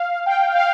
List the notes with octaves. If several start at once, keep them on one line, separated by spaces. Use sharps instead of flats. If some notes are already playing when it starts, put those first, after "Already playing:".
Already playing: F5
G5
F5